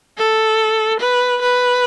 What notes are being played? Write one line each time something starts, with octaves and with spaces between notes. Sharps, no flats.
A4
B4
B4